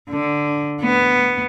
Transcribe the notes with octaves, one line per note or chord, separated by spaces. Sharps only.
D3
B3